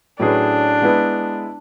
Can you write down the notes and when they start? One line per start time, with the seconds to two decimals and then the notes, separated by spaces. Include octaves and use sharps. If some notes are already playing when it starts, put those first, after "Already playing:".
0.19 A2 F#3 C#4 D4 G#4 B4
0.82 G#3 B3 E4 B4